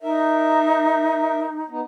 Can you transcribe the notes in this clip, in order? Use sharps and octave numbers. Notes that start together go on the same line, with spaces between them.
D#4 A#4 E5
B3 D#4